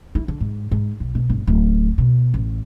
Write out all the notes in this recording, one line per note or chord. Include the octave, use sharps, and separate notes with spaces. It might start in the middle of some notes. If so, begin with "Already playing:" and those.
E4
D3
G#2
G#2
B1
B2
G1
D1
B2
A1